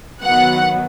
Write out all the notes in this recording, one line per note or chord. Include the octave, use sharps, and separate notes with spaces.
D#3 F#3 B3 F#5